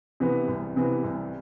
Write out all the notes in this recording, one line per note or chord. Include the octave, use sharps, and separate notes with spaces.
C3 E3 B3
C2
C3 E3 B3
C2